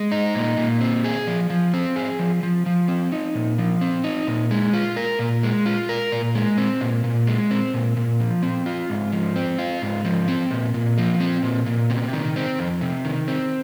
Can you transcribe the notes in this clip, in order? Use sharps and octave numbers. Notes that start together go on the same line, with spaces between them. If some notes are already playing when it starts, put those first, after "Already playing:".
Already playing: G#3
D#4
A#2
A#2
C4
G#4
F3
F3
C4
G#4
F3
F3
F3
C4
D#4
A#2
F3
C4
D#4
A#2
G#3
F4
A#4
A#2
G#3
F4
A#4
A#2
G#3
C4
A#2
A#2
G#3
C4
A#2
A#2
F3
C4
F4
G#2
F3
C4
F4
G#2
F3
C4
A#2
A#2
F3
C4
A#2
A#2
C3
D#3
C4
F2
C3
D#3
C4